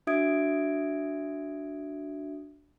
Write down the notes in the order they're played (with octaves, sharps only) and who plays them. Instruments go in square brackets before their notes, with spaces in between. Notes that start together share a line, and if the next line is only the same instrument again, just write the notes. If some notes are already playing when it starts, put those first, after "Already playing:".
[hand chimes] D4 F#4 E5 D#6 G#6 D7